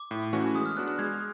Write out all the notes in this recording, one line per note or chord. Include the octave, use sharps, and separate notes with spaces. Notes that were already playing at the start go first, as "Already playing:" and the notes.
Already playing: D6
A2
E3 A3 C#4 F#4
G#3 D#6
F6
B3 D4 F#4 F#6
F#6
G#3 G#6